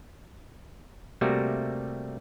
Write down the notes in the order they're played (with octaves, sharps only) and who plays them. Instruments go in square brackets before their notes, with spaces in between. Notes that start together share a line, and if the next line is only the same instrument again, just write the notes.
[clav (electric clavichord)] C3 G3 A3 A#3 F#4 E5